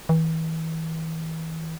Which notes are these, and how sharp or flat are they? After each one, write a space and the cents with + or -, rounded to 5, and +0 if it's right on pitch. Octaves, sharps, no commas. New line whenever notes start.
E3 -35